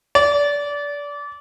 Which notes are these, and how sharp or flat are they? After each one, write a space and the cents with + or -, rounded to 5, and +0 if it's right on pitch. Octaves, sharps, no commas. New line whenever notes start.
D5 -25